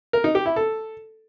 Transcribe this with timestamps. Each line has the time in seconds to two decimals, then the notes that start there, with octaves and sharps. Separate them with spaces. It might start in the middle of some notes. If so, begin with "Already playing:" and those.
0.13 A#4
0.24 D#4
0.35 G4
0.46 E4
0.56 A4